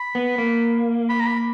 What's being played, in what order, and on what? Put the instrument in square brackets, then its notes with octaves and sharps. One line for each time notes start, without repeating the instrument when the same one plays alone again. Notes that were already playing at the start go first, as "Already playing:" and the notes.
Already playing: [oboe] B5
[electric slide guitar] B3
A#3
[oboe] B5
A#5
B5